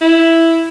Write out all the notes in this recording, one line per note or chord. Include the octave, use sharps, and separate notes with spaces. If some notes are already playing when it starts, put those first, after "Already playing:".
E4